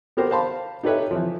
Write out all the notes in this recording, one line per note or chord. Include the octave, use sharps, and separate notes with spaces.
B3 G4 A#4 C5
C5 F5 A5 B5 C6
D#4 G4 A4 B4 C#5 E5
E3 F3